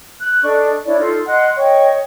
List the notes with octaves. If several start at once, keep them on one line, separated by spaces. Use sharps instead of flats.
F#6
D4 A4 D#5 C#6
D4 E4 C#5 D5
D#4 F4 A4 C6
D#5 F#5 C6 F#6
C#5 D#5 G5 C#6